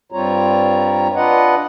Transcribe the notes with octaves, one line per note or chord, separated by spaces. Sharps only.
G2 G3 C4 F4 C#5 A#5
D4 F4 B4 D#5 F#5